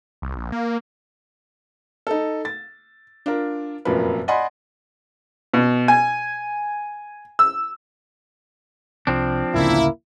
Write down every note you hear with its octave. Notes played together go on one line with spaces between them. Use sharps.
C2
A#1
A#3
D#4 A4
A6
D4 F4 A#4
F1 F#2 A#2 A#3 B4
D5 D#5 F#5 G#5 B5 C6
B2
G#5
E6
C2 F3 C4 D4
A1 D2 C#3 A#3 E4